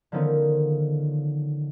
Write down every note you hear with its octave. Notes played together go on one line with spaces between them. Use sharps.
D3 D#3 F3 B3 C#4 D#4